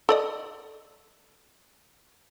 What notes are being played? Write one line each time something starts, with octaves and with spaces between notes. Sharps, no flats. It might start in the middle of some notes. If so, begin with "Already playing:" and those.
A4 D5 D#5